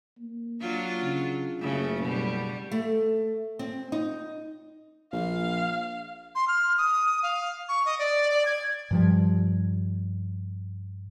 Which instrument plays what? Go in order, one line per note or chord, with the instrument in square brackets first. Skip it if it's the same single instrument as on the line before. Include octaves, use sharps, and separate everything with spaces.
[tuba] A#3
[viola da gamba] F#3 D4 F4
[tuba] C#3
[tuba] F#1 [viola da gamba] C#3 A3
[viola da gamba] B2 G3
[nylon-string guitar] A3
C4
D#4
[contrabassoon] A#1 [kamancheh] F5
[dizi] C6
F6
D#6
F5
C#6
D#5
D5
D5
G#6
[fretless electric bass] G2 F3 G3